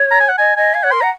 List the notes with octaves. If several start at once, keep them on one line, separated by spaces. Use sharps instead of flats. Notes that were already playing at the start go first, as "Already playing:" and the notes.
Already playing: C#5
A#5
G#5
F#5
D#5 G#5
D#5 G#5
F5 G#5
C#5 F#5
A#4 C6
F#5 A#5